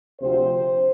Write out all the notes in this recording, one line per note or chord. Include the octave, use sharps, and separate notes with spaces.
D2 C3 F3 C4 C5